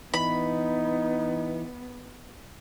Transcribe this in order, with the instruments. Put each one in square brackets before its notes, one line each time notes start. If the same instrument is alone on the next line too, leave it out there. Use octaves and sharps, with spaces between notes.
[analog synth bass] E3 [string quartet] B3 [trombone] D#4 [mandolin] B5